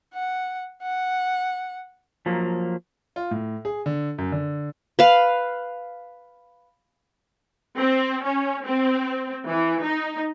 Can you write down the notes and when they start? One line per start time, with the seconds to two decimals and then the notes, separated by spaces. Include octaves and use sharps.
0.14 F#5
0.83 F#5
2.26 F3 F#3 A#3
3.16 F4
3.31 A2
3.65 G#4
3.86 D3
4.18 F#2
4.32 D3
4.99 B4 F5
7.78 C4
8.24 C#4
8.66 C4
9.49 E3
9.84 D#4